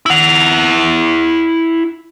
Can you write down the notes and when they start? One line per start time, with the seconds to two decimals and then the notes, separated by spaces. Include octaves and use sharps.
0.06 E4 F#5